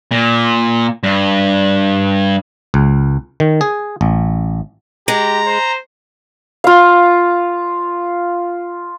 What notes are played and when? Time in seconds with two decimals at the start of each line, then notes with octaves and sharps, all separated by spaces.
0.11 A#2
1.03 G2
2.74 C#2
3.40 D#3
3.61 G#4
4.01 A1
5.08 G#3 G4 A#5
5.46 C5
6.64 F4 F5